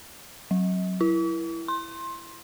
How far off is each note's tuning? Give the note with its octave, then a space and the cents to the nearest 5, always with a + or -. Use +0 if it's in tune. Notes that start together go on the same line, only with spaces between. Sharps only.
F#3 +5
E4 +10
C6 +20